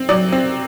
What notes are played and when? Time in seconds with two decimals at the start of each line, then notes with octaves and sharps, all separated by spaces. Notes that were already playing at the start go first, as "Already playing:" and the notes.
Already playing: C4
0.09 F#3 D5
0.32 C4